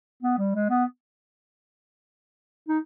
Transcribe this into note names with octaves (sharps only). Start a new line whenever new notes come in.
B3
G3
G#3
B3
D#4